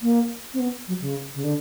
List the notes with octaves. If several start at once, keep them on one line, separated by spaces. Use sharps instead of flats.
A#3
C4
B3
F#3
C#3
C#3
D3